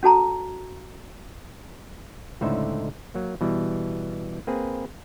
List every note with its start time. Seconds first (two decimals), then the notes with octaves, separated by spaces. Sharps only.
0.03 C#4 F#4 A4 A5 A#5
2.41 C#2 A2 D3 D#4 C5 E5
3.15 F#3 A#3
3.41 B2 E3 G3
4.47 A#3 C4 G#4 B4